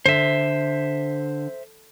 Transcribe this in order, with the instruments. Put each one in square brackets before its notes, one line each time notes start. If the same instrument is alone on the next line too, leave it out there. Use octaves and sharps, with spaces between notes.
[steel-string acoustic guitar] D3 [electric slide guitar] C5 E5